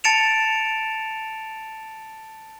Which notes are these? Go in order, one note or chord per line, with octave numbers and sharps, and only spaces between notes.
A5 A6 C#7 D7 E7 F7